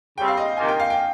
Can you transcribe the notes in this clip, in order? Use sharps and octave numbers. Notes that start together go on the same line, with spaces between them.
C#3 G3 C4 G5
F5
D#5
C3 D#3 A#3 F4 G#5
G5
F5
G5